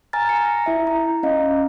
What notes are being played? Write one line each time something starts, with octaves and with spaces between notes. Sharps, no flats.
G#5 A#5 F6 A6
A#5 C#7
A#6
E4 E5
A#5
C#4 D#5 F5